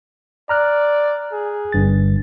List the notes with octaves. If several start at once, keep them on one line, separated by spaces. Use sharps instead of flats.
D5 A#5 F6 F#6
G#4
G1 G2 A6